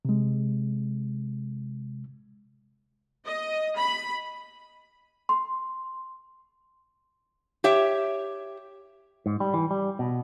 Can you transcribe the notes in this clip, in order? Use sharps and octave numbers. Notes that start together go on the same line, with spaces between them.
C3 G#3
D#5
B5
C6
G4 C#5 E5 G5
G#2
G3
E3
G3
B2